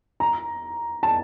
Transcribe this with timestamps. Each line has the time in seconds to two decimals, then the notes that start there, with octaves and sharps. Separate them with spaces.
0.20 A#5
1.03 A5